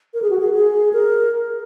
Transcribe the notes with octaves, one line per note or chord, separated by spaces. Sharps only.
A#4
G#4
F#4
G#4
G#4
A#4